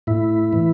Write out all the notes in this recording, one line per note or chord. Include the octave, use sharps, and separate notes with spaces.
A2 E4
E3